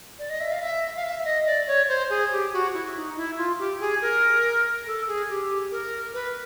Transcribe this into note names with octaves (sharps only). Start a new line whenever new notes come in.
D5
D#5
E5
F5
E5
F5
E5
D#5
D5
C#5
C5
G#4
G4
F#4
E4
D#4
E4
F4
G4
G#4
A#4
A4
G#4
G4
A#4
B4